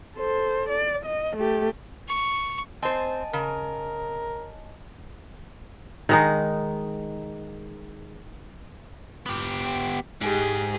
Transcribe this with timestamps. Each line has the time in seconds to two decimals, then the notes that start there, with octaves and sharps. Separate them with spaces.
0.17 A4 C5
0.69 D5
1.05 D#5
1.37 A3 G4
2.08 C#6
2.82 C4 C5 D#5 G#5 A5
3.33 C#3 A#4
6.09 D#3 G#3 D#4
9.26 B3 G4
10.21 G#2 G4 G#4